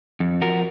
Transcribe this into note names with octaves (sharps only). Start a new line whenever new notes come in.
F2
F3 F#4 A#4